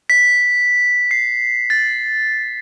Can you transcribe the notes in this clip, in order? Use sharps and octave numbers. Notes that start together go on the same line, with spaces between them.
B6
C7
A6